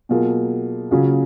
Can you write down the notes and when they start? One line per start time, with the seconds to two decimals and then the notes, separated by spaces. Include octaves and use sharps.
0.09 B2 F#3 A#3 F4 G#4
0.91 C#3 F#3 C#4 F4 G#4